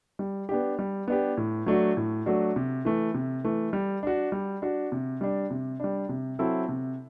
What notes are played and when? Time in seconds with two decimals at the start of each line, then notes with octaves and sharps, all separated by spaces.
0.19 G3
0.49 B3 D4 G4
0.79 G3
1.08 B3 D4 G4
1.37 A2
1.66 F#3 A3 D4 F#4
1.97 A2
2.26 F#3 A3 D4 F#4
2.56 C3
2.85 E3 A3
3.14 C3
3.44 E3 A3
3.73 G3
4.03 D4 F#4
4.32 G3
4.62 D4 F#4
4.92 C3
5.21 G3 D4
5.51 C3
5.80 G3 D4
6.09 C3
6.39 F#3 C4 E4 A4
6.68 C3